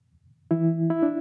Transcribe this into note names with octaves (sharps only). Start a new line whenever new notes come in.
E3 E4
E4
D4